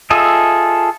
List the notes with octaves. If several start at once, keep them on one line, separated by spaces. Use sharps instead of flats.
F4 G#4 A4 D#5 E5